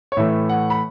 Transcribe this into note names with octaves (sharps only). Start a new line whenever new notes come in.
C#5
A2 E3 A3 E5
F#5
B5